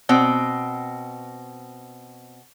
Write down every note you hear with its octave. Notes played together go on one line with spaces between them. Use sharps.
B2 C4